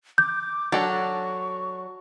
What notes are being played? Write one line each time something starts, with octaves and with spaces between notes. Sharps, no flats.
D6 G6
F#3 D4 A4 D5 C#6